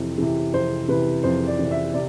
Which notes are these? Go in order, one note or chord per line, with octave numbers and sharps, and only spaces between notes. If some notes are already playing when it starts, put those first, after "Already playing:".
Already playing: F2 C3 E3
C3 E3
F2 C5
C3 E3 B4
F2 C5
D5
C3 E3
E5
C3 D5